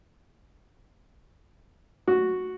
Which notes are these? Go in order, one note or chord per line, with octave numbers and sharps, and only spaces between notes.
F#4